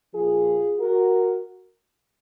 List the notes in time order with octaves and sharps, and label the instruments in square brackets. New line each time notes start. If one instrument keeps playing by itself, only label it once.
[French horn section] A#2 F3 F4 G#4
F#4 A#4